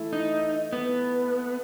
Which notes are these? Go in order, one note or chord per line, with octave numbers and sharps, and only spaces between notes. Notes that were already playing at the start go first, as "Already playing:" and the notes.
Already playing: E3 A3 E4
D#4
B3